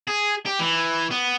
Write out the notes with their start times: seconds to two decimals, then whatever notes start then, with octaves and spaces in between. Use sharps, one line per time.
0.08 G#4
0.46 G4
0.59 E3
1.11 B3